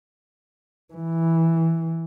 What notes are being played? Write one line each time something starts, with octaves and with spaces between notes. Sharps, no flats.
E3